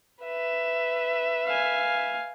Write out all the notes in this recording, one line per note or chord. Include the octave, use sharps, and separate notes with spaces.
B4 E5
F5 G#5